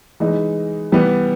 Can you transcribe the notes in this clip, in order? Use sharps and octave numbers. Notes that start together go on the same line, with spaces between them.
E3 G#3 D#4
E3 G3 B3